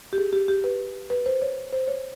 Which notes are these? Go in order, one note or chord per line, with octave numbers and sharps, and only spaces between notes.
G4
G#4
G4
G4
B4
B4
C5
C#5
C5
C#5